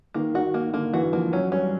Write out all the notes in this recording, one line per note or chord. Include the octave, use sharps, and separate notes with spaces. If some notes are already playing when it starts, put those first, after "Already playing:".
D#3 A#3
D#3 F#4
A#3
D3 A#3
E3 F#4
F3 A#3
F#3 C#4
G3 C#4